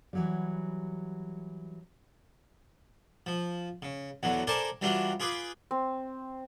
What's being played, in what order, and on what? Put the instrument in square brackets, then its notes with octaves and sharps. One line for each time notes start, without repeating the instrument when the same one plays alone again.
[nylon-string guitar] E3 F#3 G3
[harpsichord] F3
C#3
E2 D3 F#3
A4 A#4 C5 D5 G#5 A5
E3 F#3 G3 D4 F4
F4 G#4 B4 D6
[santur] C4